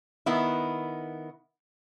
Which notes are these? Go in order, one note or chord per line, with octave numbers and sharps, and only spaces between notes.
D#3 B3 E4